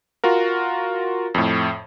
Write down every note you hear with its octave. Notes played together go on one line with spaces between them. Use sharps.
F4 F#4 A#4
F2 A2